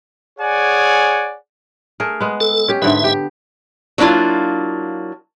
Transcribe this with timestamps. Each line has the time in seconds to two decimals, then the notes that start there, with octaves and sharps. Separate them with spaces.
0.39 G#4 C#5 D5 F#5 G#5
2.00 A3 G#4 A#4
2.20 G#3 B3
2.41 A4
2.68 C#4 G4
2.82 G#2 D3 B3 E5
3.04 G4
3.98 F#3 A#3 D4 E4 F4